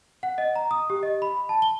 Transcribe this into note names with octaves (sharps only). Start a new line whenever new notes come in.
F#5
D#5
A#5
D#6
G4
D#5
B5
A5
G7